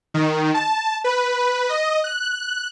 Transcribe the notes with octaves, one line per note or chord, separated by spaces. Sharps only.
D#3
A5
B4
D#5
F#6